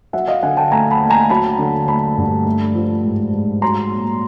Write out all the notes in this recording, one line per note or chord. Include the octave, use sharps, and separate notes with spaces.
F#3 E5 F#5
D#5 F5
D3 F#5 G#5
G5 A5
A3 G#5 A#5
A5 B5
D#2
G#5 A#5
F#3 A5 B5
D3
A3 A5 B5
G2
A3
F3
G#2
G#2
F#3 A#5 C6
A#2